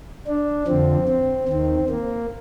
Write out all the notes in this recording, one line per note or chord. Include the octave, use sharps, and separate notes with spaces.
D4
F2 D3 F3 C4
C4
D#2 D#3 C4
A#3